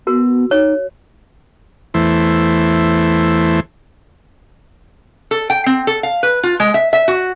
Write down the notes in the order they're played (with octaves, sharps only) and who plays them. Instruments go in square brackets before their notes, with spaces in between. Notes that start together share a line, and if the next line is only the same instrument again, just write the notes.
[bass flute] B3 [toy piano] F#4 A#4
[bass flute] D#4 [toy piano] C#5
[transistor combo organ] E2 E3 A3 C5
[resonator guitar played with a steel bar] A4
G5
C4
A4
F5
B4
F4
G#3
E5
E5
F#4